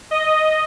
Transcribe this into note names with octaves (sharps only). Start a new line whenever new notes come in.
D#5